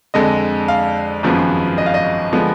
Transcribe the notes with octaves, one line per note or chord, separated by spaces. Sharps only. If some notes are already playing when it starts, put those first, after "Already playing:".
F2 D3 G#3 D#5
F5
G#1 F#2 F3 G#3 B3
D#5
F5
D#5
D3 F3 G#3 B3